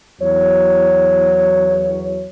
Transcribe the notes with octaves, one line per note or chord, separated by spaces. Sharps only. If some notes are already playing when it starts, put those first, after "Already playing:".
E2 F#3 C#5